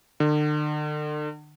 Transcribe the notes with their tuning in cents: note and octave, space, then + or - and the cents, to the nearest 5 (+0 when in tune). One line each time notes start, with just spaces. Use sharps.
D3 +40